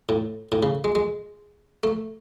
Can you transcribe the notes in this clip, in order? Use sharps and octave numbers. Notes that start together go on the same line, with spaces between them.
A2
A2
C#3
G#3
G#3
A3